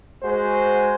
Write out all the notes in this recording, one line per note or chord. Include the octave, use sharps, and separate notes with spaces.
G#3 F#4 C5